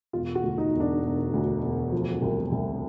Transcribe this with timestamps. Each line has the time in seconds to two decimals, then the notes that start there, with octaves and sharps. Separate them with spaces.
0.13 E1 F4
0.35 F#4
0.43 D2
0.58 D#4
0.74 E1
0.80 D4
1.03 E1
1.33 D2
1.63 E1
1.92 F3
2.22 C2
2.52 C2